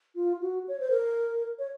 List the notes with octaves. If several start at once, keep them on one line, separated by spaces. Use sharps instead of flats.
F4
F#4
C#5
C5
A#4
C#5